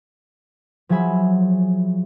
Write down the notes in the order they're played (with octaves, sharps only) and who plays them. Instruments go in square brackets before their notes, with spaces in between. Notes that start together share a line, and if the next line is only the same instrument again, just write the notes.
[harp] F3 F#3 G#4 E5 G#5 B5